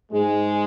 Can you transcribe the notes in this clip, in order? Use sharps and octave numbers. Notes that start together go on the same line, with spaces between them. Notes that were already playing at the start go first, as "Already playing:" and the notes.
G#2 G#3